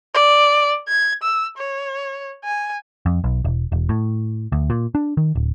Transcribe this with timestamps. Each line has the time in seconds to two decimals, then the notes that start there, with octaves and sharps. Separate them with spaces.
0.14 D5
0.88 G#6
1.23 E6
1.57 C#5
2.44 G#5
3.06 F2
3.24 B1
3.45 E1
3.72 E1
3.89 A2
4.52 D2
4.70 A#2
4.95 D4
5.17 D#3
5.35 D1